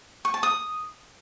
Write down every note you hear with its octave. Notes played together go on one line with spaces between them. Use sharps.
C#6
A5
D#6